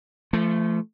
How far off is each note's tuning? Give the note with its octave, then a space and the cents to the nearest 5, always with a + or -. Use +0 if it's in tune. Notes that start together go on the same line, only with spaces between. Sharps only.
F3 -35 A3 +0